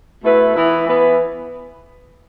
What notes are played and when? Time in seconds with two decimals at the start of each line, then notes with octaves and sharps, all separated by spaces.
0.23 B2 A3 E4 B4
0.54 E3 B3 E4 B4
0.86 E3 B3 E4 B4